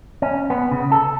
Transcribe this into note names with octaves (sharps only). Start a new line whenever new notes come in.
C#4
B3
C#3
A4